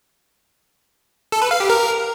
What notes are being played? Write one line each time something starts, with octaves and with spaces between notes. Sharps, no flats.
A4
B4
F5
G4
A#4